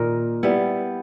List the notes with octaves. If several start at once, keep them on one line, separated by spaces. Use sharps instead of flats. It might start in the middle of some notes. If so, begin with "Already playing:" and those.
Already playing: A#2 D#3 D#4 A#4
G3 B3 E4